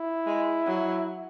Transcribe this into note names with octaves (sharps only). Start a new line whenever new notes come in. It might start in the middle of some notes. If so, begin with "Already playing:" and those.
Already playing: E4
G#3
F#3